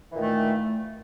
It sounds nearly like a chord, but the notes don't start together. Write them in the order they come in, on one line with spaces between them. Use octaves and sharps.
E3 A#2 D#3 A3